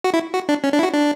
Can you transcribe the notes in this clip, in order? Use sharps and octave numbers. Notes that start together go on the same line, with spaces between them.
F#4
E4
F#4
D4
C#4
D4
E4
F#4
D4